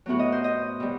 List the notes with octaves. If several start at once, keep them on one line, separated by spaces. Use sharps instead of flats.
A2 F#3 B3 F#4
D#5
C5
D#5
B2 G3